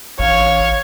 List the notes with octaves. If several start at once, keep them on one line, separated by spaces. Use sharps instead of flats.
A1 C#5 F5